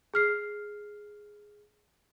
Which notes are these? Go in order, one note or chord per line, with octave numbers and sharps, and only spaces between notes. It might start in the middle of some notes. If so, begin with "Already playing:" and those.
G#4 F6 C7